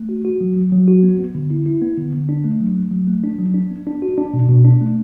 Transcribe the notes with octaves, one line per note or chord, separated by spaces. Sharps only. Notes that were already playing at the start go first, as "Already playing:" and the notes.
Already playing: A3
F#4
F#4
F#3
F#3
F#3
F#4
B3
B3
D3
E4
E4
B3
D3
D3
D4
A3
F#3
A3
F#3
A3
D4
F#3
D4
B3
D4
F#4
D4
B2
B2
D4
A3